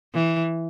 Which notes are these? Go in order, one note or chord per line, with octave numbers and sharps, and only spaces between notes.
E3